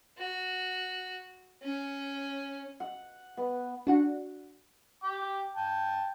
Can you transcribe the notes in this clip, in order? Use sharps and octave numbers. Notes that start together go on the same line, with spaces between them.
F#4
C#4
F#5
B3
D4 F#4 F#5
G5 D6
G5 A5